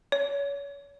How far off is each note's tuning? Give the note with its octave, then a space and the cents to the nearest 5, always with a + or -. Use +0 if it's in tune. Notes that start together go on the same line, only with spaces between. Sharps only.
C#5 +30